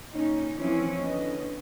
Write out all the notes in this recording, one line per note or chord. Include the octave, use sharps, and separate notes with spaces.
A#2 C#4 D#4
E3 F3 C4 C#4 E4
D3 B3 C#4 D#5